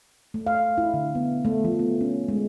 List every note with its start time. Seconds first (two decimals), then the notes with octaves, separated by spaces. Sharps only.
0.34 A3
0.47 F5
0.78 E4
0.94 D3
1.15 B3
1.45 A3
1.64 F3
1.79 B3
2.01 C#4
2.28 G#3